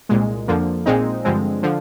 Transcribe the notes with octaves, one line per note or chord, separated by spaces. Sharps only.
C2 A#2 G#3
F2 D3 F3 A#3
A#1 A#2 G#3 C4 D#4
G2 D3 F3 G#3 C4
D3 F3